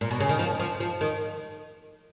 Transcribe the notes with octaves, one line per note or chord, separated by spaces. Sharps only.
A#2
B2
C#3
D#3
F3
F3
F3
D#3